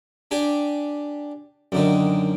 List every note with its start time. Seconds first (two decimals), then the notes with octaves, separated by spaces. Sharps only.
0.31 D4 G4 G#5
1.72 F#2 D3 D#3